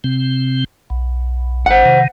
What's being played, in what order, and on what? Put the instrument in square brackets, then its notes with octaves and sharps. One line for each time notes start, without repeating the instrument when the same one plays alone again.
[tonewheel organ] C3 C4
B1
[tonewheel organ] G#1 [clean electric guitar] C5 F#5
[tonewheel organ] C3 D#3